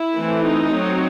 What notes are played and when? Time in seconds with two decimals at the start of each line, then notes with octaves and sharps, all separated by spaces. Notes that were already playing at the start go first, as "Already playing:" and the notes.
Already playing: E4
0.16 E3 A3 C4
0.45 D#4
0.74 F#3 C4